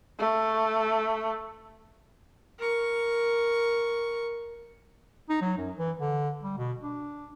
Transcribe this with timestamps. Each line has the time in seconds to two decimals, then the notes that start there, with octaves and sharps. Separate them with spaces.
0.20 A3
2.58 A#4 C#6
5.29 D#4
5.41 F#3
5.58 F#2
5.78 E3
5.99 D3
6.43 G3
6.58 B2
6.82 D4